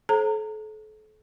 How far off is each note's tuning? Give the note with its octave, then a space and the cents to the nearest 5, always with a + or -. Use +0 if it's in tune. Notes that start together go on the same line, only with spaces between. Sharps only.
A4 -35 C5 +40 A#5 -25